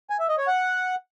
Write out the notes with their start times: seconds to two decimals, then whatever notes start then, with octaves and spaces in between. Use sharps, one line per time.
0.10 G#5
0.19 E5
0.29 D#5
0.38 C#5
0.47 F#5